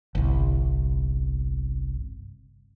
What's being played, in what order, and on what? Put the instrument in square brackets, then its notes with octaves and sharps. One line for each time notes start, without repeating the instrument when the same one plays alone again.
[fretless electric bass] G1 C2